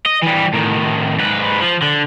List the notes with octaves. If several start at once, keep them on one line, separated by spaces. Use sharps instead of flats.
D#5
E3 G3
A2 D#3
G#2 B4
F3
D3